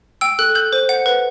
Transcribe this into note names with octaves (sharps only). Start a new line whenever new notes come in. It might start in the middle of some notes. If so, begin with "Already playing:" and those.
G5 E6
A4 F#6
A4 G6
C5
F#5
B4